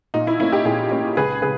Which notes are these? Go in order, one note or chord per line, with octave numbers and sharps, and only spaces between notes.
A#2 D#4
E4
A#3 C#4 E4
D#4 G4
A#2 E4 G#4
A#3 C#4
C#2 G#4 B4
C#3 G#4 B4